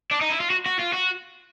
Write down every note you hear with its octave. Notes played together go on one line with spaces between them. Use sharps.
D4
D#4
E4
F4
F#4
F#4
F4
F#4